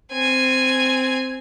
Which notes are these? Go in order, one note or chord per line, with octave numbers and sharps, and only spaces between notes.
C4 G#5